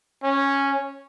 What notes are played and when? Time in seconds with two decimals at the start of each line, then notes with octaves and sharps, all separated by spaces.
0.23 C#4